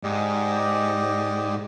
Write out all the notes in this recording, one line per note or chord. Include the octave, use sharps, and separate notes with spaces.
G#2 G4 D5 D#5